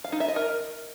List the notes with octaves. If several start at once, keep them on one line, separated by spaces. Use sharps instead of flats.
F5
D#4
E5
D#5
A#4